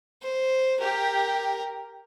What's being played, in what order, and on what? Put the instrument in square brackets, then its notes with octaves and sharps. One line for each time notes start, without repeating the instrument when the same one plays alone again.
[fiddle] C5
[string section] G4 [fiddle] A#4